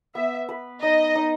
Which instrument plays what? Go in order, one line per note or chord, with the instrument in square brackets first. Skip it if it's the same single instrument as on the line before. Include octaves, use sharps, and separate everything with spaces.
[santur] B3 [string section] E5
[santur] B4
[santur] D#4 [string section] D#5
[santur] D#4